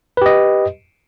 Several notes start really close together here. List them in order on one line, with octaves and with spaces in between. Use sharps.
B4 G4 D#5